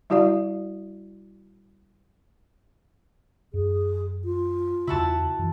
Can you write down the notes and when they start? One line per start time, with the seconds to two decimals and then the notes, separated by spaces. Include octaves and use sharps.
0.10 G3 E4 F#4 D5 F5
3.54 F#2 G#4
4.24 F4
4.87 E2 C#3 E4 F#4 A5
5.39 F#2 E3